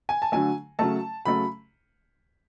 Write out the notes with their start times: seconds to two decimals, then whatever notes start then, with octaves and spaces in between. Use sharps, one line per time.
0.09 G#5
0.22 A5
0.32 D3 F#3 A3 G#5
0.79 C#3 F#3 A3 A5
1.25 C#3 F#3 A3 B5